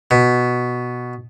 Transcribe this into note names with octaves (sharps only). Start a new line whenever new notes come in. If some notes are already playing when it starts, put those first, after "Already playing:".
B2